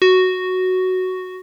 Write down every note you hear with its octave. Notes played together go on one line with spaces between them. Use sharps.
F#4